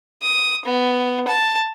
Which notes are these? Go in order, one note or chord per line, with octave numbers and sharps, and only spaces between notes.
D#6
B3
A5